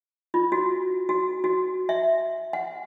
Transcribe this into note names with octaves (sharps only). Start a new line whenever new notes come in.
F4
F#4
F#4
F#4
E5
F#5